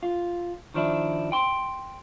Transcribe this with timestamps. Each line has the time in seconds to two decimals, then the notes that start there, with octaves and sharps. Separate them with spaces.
0.03 F4
0.74 D#3 F3 D4 E4
1.32 G5 C6